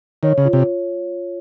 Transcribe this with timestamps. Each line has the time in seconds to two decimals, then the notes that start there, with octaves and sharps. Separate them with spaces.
0.23 D#3 C#5
0.38 C#3
0.45 F4
0.53 C3